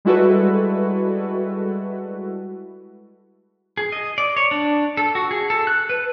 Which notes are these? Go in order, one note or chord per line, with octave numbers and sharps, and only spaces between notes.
G3 G#3 E4 F#4 A4 B4
G#4
D#5
D5
C#5
D4
A4
F#4
G#4
A4
F#6
B4